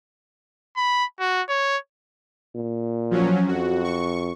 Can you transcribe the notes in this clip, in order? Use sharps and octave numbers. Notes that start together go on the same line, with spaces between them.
B5
F#4
C#5
A#2
F3 F#3 C#4
F2 F#4
C#6